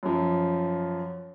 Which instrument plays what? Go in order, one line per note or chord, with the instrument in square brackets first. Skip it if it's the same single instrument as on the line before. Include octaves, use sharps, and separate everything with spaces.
[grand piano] F#2 F3